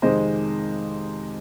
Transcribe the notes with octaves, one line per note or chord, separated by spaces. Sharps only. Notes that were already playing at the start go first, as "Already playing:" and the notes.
F2 C3 D#3 G#3 C5 D#5